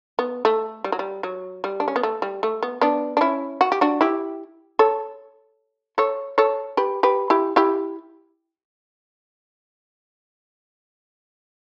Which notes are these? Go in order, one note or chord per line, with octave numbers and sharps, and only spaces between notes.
B3
A3
G3
F#3
G3
F#3
G3
D4
C#4
B3
A3
G3
A3
B3
B3 D4
D4
C#4 E4
F#4
G4
D4 F#4
E4 G4
A4 C#5
A4 C#5
A4 C#5
G4 B4
G4 B4
E4 G4
E4 G4